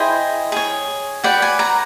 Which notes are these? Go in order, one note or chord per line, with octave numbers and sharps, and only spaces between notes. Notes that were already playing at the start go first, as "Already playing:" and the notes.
Already playing: E4 G#4 C5 D#5 G5
G#4 C#5
F#4 B4 D5 G5
G#5
A#5